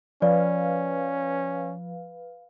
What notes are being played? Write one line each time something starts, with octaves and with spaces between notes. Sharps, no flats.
F3 C#4 B4 D5 F5